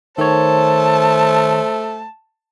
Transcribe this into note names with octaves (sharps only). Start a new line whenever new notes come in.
D#3 A3 C5 C#5 A5